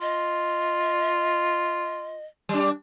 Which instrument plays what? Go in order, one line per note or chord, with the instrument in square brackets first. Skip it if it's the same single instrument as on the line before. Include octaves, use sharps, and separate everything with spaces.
[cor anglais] F4 [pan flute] D#5
[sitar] G3 D4